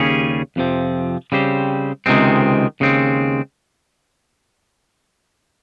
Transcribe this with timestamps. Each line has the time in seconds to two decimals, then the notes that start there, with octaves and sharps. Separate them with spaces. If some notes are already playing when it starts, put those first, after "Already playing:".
Already playing: D#2 C#3 G3 C#4 G#4
0.56 F2 C3 F3 C4
1.32 C#3 G3 C4 G4 C5
2.06 C#2 C3 D#3 G#3 C4
2.80 D#2 C#3 G#3 C4